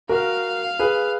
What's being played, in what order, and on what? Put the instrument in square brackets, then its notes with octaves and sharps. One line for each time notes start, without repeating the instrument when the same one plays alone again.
[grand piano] F#4 A#4 [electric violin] F5
[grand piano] G#4 B4